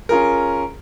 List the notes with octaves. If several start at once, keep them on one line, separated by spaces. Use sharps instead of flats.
C#4 F4 G#4 A#4